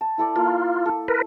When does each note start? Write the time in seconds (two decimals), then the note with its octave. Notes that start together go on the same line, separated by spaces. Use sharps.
0.01 A5
0.18 E4 A4 D5
0.36 A#3 F4
0.85 A4
1.08 A#4 B4